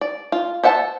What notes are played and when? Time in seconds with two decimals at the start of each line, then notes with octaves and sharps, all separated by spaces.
0.01 D5
0.32 F4
0.63 C5 E5 F#5 G#5 A5